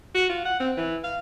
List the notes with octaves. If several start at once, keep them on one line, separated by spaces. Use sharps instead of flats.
F#4
F4
F#5
C4
E3
F5